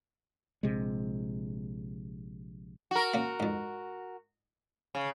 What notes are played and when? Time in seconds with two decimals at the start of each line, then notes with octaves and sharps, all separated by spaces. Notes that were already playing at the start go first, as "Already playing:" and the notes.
0.63 A#1 C3 G#3
2.91 F#4 A#4
3.14 A#3 C#4
3.40 F2 G#2
4.95 C#3